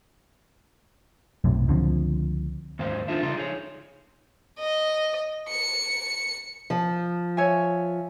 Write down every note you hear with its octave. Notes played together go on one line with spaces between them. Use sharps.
B1 F#2 A2 C3
C#2 D3 F3 C4
D#2 G#2 C5 F5
D4 D#4 F4 A4 C5 E5
C#3 G3 D#4 A4 C6
D#4 G#4 C#5
D#5
C#7
F3
C#5 E5 G#5